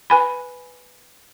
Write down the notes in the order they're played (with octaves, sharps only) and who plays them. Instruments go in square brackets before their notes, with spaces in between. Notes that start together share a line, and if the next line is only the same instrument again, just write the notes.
[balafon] B4 G#5 B5